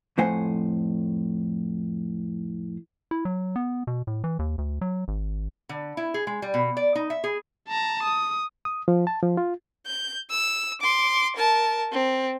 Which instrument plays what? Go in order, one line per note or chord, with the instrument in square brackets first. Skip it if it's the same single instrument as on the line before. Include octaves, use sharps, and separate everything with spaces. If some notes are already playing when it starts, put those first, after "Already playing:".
[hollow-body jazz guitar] F2 A2 A3 C5 F#5 G#5
[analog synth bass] E4
F#3
B3
B2
A2
E3
D#2
D2
F#3
G#1
[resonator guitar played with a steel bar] D3
E4
G#4
G#3
G3
B2
D5
D#4
E5
G#4
[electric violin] A5 A#5
D#6
[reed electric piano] D#6
F3
A5
F3
F4
[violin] G6
E6
C6 D6
A#4 A5
C4